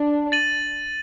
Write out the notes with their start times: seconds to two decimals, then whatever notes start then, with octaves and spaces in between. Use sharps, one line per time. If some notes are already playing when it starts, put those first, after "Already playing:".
Already playing: D4
0.32 A6 D#7 F#7